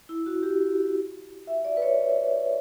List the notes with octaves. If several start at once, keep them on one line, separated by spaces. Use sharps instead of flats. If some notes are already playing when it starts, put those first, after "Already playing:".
E4
F#4
G4
E5
D5
B4
C#5